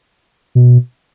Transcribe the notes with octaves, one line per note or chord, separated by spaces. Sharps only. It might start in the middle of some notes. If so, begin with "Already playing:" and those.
B2